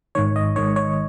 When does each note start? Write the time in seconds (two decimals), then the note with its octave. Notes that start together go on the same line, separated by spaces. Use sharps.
0.15 G#1 G#2 D#3 C#5
0.36 D#5
0.56 G#1 G#2 D#3 C#5
0.76 C#5